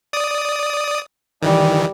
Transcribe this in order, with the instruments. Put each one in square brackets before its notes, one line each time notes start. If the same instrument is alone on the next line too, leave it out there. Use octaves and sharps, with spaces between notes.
[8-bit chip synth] D5 D#6
[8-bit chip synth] D#3 E3 [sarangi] G3